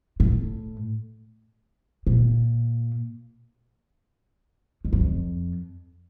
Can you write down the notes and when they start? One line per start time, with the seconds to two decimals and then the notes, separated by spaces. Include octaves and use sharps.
0.20 A2
2.07 A#2
4.85 F2
4.93 E2
5.00 F2